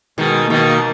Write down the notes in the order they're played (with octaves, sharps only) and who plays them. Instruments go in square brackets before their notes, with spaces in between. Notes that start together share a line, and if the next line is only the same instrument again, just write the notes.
[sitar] B2 D#3 [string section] G#3
[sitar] B2 D#3 [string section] A#3